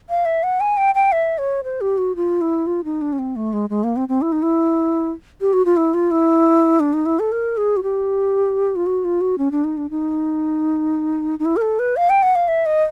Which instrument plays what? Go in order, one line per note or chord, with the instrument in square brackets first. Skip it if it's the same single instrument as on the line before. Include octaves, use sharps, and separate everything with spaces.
[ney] F5
E5
F#5
G#5
G5
G5
E5
C#5
C5
G4
F#4
F4
E4
F4
D#4
D4
C#4
C4
A3
G#3
G#3
A#3
C4
C4
E4
D#4
E4
G4
F#4
F4
E4
F4
E4
D4
D#4
E4
A4
A#4
G#4
F#4
G4
F4
F#4
F4
F#4
C#4
D4
D#4
D4
D#4
D#4
E4
A#4
A4
B4
F5
G5
F#5
F5
E5
D#5